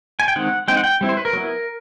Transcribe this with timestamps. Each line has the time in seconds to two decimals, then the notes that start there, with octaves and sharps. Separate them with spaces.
0.20 G#5
0.28 G5
0.36 D#3 G#3 C4 D#4 F#5
0.68 G#3 C4 D#4 G5
0.77 F#5
0.84 G5
1.01 G3 C4 E4
1.09 C5
1.17 B4
1.25 A#4
1.33 F#3 B3 E4